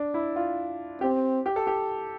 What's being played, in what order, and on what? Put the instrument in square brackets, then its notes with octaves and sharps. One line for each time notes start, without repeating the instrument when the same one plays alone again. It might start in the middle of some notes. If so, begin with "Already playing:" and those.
Already playing: [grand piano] D4
E4
F4
[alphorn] C4 [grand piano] G4
[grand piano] G4
A4
G4